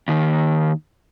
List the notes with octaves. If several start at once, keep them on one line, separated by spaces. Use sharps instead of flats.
D#2 D#3